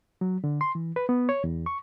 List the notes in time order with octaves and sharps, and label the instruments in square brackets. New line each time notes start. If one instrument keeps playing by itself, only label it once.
[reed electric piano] F#3
D3
C6
E3
B4
B3
C#5
E2
C#6